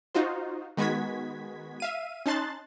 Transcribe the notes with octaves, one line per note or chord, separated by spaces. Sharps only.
D#4 F4 F#4 C5
D#3 G#3 B3 F#4 G#6 B6
E5 F5 D#7
C#4 D#4 A5 C6 F#6 A6